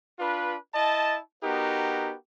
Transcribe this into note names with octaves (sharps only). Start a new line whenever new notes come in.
D4 F4 B4
E4 D#5 A5
B3 D#4 F#4 G4 A#4